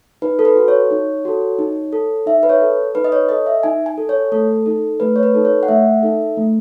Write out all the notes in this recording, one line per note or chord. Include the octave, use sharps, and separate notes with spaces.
D#4 B4
A4
B4
F#4 A4
C#5
D#4
F#4 A4
D#4
A4
D#4 E5
B4
C#5
A4
D#4 B4
D#5
C#5
A4 D#5
E5
D#4 G#5
G#5
A4
C#5
A3 A4
D#4 A4
A3 B4
C#5
B4
D#4 A4
C#5
F#5
A3 E5
D#4 A4
A3